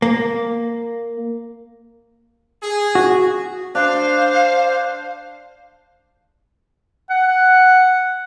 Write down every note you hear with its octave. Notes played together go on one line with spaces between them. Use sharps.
A#3
G#4
F#4
D4 C5 F5
F#5